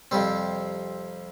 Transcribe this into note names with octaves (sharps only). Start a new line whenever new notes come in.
F2 C3 G3 C4